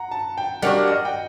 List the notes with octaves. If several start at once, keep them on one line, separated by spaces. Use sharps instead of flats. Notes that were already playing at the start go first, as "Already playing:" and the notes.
Already playing: F#5 A#5
A5
G5
G3 A#3 D4 F#4 F#5
D#5
G5